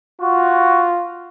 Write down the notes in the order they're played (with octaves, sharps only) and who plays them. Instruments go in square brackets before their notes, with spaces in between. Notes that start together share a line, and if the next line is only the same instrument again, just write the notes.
[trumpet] F4 [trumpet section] F#4